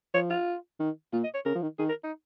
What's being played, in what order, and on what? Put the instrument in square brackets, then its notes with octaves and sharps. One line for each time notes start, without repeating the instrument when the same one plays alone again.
[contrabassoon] F3 [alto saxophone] C#5
[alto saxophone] F4
[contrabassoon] D#3
[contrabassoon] A#2 [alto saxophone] F4
[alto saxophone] D#5
C#5
[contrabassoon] C#3 [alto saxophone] A#4
[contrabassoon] F3
D#3
[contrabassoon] D#3 [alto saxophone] G#4
[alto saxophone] A#4
D#4